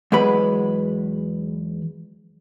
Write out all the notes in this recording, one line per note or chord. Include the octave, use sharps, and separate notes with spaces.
E2 F#3 G#3 B4 B5